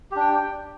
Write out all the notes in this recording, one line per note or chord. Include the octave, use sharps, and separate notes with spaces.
D4 G4 G5